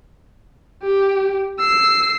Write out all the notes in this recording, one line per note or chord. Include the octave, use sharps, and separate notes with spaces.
G4
E6 C7